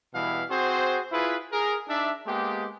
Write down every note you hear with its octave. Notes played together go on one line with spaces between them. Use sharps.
B2 E3 G3 E4 F5
C4 F#4 G#4 C5
E4 F4 G#4 B4
G#4 A#4
D4 D#4 D5 E5
G#3 A#3 B3 G4